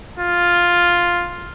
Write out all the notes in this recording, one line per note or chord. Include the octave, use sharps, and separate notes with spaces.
F4